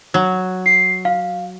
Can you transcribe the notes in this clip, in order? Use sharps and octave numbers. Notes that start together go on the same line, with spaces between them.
F#3
C7
F5